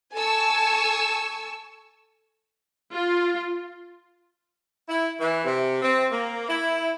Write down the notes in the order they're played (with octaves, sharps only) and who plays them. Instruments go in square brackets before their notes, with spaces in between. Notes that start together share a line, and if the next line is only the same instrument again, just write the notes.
[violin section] A4 G#5 A5 C#6 E6
[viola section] F4
[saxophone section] E4
E3
C3
C4
A#3
E4